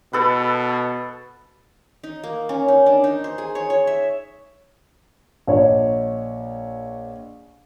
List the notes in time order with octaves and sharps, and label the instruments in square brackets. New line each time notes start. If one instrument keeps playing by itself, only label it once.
[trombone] B2 [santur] A4 B4
[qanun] D#4
A#3
C#4
D#4
D4
D#4
C5
G#4
C#5
C#5
E5
[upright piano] A#1 C#5 D#5